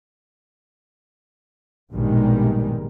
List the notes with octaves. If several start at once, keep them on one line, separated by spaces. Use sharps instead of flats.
A#1 G2 B2 D#3 G3 G#3